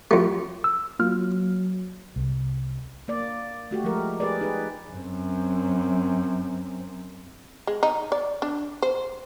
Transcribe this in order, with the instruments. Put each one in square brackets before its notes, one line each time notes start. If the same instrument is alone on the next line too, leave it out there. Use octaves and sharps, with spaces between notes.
[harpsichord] F2 A3 [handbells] F#4 G4
[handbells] E6
[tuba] F#3 [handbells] A#3 F4 F6
[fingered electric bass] C2
[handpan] A#3 D5
A3 F#4 G4
F3 G#3 A#4
G4 G#4 A#4 B4 D5
D#4 G#4 B4
[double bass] F#2 C4
[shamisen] G#3
D#4
D5
D4
C5